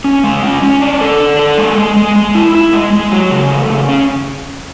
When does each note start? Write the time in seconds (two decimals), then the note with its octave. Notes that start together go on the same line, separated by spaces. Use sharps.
0.04 C#4
0.24 G#3
0.43 C#4
0.62 C#4
0.81 D4
1.01 A4
1.20 D4
1.39 A4
1.58 G#3
1.78 G#3
1.96 G#3
2.16 G#3
2.35 E4
2.55 E4
2.73 G#3
2.93 G#3
3.11 F#3
3.31 C#3
3.51 A3
3.70 C#3
3.89 C#4